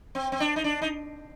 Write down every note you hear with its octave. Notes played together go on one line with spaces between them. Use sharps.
C4
C4
D4
D#4
D4
D#4